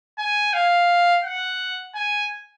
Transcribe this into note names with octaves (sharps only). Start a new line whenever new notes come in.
G#5
F5
F#5
G#5